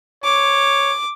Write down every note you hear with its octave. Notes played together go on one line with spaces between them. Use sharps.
C#5 D6